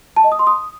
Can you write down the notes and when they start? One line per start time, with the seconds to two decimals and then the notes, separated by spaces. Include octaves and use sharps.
0.17 A5
0.24 D#5
0.32 D#6
0.39 C6
0.47 D#6